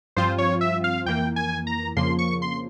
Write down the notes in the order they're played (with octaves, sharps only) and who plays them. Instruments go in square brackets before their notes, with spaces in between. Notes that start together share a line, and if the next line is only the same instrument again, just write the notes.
[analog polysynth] G2 F3 C4 F4 [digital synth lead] C5
[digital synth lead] C#5
E5
F5
[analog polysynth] F2 E3 A#3 [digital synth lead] G5
[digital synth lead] G#5
A#5
[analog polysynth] F2 C#3 F3 A#3 [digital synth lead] C6
[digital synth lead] C#6
C6